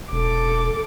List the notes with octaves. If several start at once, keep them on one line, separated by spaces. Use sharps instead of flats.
E1 A4 D6